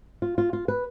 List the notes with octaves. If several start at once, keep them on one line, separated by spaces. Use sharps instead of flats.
F4
F4
F4
B4